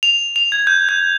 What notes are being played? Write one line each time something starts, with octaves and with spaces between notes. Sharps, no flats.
F7
F7
G#6
G6
G6